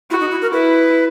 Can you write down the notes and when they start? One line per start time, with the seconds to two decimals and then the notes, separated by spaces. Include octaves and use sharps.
0.10 E4 F#4
0.20 D#4
0.31 E4
0.42 A#4
0.53 E4 B4